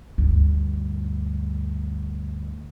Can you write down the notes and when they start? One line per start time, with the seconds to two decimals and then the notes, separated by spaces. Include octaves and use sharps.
0.18 D2 G2